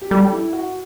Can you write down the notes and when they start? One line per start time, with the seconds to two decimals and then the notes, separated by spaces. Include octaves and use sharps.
0.01 G4
0.10 G3 A4
0.32 E4
0.53 F#4